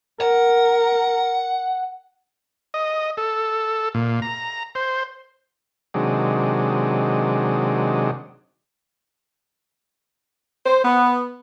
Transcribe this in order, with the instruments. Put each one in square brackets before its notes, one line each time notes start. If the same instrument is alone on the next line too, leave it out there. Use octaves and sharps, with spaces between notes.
[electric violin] A#4 [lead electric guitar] F#5
[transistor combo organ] D#5
A4
A#2
A#5
C5
C3 D#3 F#3 G#3 D4
[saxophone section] C5
B3